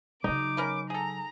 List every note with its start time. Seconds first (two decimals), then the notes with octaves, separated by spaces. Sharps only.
0.24 C#3 F#3 D#4 D6
0.57 C#4 A#4 B4
0.90 G#4 A4 A#5